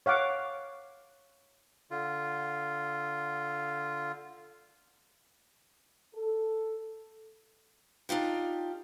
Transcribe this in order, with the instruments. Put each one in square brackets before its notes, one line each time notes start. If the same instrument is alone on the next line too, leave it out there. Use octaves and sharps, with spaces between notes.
[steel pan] C#5 F5 F#5 D6
[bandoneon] D3 F4
[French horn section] A4
[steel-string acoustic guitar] D4 D#4 F4 G4